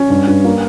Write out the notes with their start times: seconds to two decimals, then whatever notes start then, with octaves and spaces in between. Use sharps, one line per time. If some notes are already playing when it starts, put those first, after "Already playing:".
Already playing: C#4
0.10 G2
0.27 G2
0.44 A#3